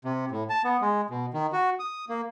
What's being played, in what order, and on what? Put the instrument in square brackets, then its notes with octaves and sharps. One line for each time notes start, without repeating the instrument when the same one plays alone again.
[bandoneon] C3
A2
A5
B3
G#3
B2
D#3
F#4
D#6
A#3